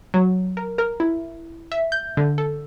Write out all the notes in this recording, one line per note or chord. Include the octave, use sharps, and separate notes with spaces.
F#3
A#4
A#4
E4
E5
G6
D3
A4